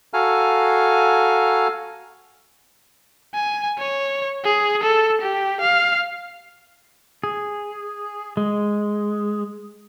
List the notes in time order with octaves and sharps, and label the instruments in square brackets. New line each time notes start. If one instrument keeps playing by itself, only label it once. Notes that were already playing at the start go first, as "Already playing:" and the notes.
[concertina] F#4 A4 F5 G#5 A#5 F6
[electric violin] G#5
C#5
G#4
A4
G4
F5
[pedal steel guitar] G#4
G#3